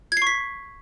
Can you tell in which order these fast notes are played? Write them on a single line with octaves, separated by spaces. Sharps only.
G#6 C7 C#6 B6